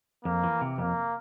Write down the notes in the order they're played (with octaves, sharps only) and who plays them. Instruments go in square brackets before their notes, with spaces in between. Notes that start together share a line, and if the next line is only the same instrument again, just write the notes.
[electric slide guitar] F2 [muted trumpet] A#3
[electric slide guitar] E3
C3
[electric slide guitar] F2 [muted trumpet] A#3